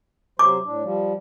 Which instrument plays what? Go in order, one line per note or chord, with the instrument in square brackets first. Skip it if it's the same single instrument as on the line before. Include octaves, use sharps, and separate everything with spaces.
[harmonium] C3 F#3 C5 [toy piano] D6
[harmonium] A2 D4
F3 G3